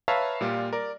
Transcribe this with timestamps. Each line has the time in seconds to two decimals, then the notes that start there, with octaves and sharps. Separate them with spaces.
0.08 B4 C#5 E5 F5 A5 A#5
0.41 A#2 G3 F4
0.73 A#4 D5